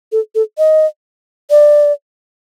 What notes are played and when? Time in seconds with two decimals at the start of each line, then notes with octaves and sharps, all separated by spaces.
0.12 A4
0.35 A4
0.58 D#5
1.50 D5